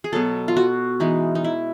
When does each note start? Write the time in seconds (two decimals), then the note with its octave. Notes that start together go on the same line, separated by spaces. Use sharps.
0.04 G#4
0.13 B2 F#3 B3 A4
0.48 F4
0.57 F#4
1.00 E3 G#3 B3 D#4
1.35 D#4
1.44 E4